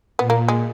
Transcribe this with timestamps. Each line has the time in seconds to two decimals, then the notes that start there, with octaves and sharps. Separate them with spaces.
0.19 A#2 B3
0.30 A#3
0.48 G#3